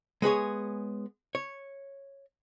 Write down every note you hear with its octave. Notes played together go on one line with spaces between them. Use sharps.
G#3 B3 G#4 C#5
C#5